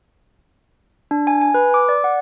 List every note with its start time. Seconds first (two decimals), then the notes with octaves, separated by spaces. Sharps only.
1.11 D4
1.27 G#5
1.41 G#5
1.54 B4
1.74 D6
1.89 D5
2.04 F#5